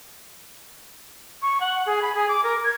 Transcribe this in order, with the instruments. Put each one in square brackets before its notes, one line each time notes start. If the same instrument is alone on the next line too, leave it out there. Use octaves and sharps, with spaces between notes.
[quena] C#6
F#5
G#4
B5
G#4
D6
A#4
G#6